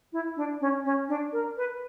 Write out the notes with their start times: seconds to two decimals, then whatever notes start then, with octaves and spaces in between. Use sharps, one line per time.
0.12 E4
0.36 D4
0.60 C#4
0.84 C#4
1.08 D4
1.32 A#4
1.57 B4